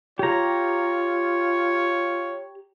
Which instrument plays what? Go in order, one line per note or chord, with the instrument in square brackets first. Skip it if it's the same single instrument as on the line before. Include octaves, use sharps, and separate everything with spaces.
[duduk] F4 [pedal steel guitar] G4 A#5 [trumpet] C#5